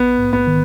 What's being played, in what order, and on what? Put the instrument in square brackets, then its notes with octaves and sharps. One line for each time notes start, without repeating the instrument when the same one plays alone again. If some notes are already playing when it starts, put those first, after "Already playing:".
Already playing: [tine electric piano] A#1 [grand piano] B3
[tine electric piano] G#2
[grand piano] B3
[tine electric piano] D#3